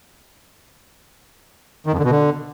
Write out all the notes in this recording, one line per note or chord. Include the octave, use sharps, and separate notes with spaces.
D#3
F2
D3
B2
D3